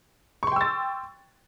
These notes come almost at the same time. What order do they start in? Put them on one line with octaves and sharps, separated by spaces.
C#6 C6 G5 E6 A6